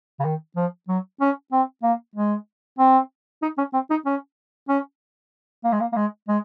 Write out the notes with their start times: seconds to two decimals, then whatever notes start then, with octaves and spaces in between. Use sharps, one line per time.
0.20 C#3
0.25 D#3
0.56 F3
0.89 F#3
1.21 C#4
1.52 C4
1.83 A#3
2.16 G#3
2.79 C4
3.42 D#4
3.58 C#4
3.74 C4
3.90 D#4
4.06 C#4
4.69 C#4
5.64 A#3
5.72 G#3
5.81 A#3
5.92 A#3
5.96 G#3
6.28 G#3